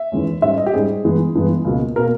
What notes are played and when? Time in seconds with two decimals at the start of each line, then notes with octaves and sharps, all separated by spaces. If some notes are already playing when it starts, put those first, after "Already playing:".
Already playing: E5
0.12 E2 D#3 G#3 C#4
0.42 G#2 G3 C#4 E5
0.58 D#5
0.66 G4
0.73 G#2 G3 C#4 G#4
1.04 G2 E3 G#3 B3
1.35 G2 E3 G#3 B3
1.65 C#2 B2 A#3
1.96 B2 A#3 A#4